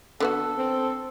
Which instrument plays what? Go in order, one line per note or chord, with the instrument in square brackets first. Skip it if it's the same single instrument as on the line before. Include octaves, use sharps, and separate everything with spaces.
[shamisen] D3 B3 F#4 [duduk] A4
[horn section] C4